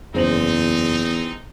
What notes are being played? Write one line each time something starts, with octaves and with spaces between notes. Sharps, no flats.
F#1 E2 G#3 C4 D#4 C5 F#7